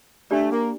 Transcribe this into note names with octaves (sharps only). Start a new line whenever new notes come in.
A3 D4 G4 D5
A#3